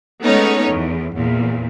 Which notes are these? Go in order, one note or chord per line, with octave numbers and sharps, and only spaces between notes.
G#3 A3 B3 C#4 D#4 C#5
E2
E2 A#2